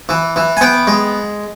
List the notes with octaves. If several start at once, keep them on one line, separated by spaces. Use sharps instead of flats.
E3
E3
G#5
B3 G5
G#3